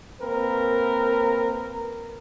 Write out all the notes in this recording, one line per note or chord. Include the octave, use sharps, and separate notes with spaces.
A#3 C4 A#4 B4